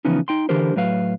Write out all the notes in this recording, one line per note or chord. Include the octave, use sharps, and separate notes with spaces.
C#3 E3 F3 B3 C#4 D#4
D#4 G5 C6
D3 E3 D4 G4 A#4 C5
A2 F#3 B4 F5